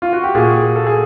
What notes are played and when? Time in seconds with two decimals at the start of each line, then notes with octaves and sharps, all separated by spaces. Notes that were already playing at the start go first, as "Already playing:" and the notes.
0.02 F4
0.13 F#4
0.24 G4
0.34 A#2 F#4 G#4
0.76 A4
0.87 G#4